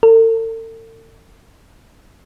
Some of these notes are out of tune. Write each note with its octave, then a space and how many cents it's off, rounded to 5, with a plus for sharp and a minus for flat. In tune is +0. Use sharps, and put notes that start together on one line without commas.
A4 +45